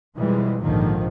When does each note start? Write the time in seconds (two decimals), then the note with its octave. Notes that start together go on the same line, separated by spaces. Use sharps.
0.17 F2 B2 E3 G3 G#3
0.62 A#1 D#2 G#2 D3 D#3 F3